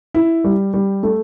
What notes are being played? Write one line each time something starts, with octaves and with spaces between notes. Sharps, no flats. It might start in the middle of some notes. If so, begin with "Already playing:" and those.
E4
G3
G3
A3